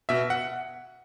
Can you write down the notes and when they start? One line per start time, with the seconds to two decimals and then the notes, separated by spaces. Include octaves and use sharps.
0.09 B2 E5
0.30 F#5